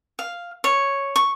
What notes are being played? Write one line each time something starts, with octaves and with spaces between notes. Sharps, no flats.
F5
C#5
C#6